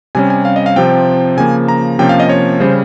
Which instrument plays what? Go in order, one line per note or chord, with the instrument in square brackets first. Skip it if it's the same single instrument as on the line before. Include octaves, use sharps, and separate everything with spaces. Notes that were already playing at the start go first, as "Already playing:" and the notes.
[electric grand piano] C3 G3 C#4 G#5
G#5
F5
D#5
F5
C3 F3 C4 G5
C#3 F3 A#3 G#5
A#5
C3 F3 A#3 C#4 G5
F5
D#5
C#5
C#3 G3 C#4 C5